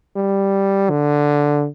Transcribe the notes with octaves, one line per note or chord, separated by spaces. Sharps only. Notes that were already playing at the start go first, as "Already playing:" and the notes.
G3
D3